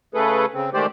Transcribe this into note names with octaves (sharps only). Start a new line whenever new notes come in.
C#3 A3 G#4 A4 B4
C#3 C4
D#3 G#3 A3 G4 C5 D5